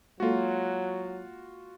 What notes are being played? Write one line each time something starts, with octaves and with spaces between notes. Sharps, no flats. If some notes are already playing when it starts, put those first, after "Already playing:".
F#3 G#3 A#3 F4 F#4 A4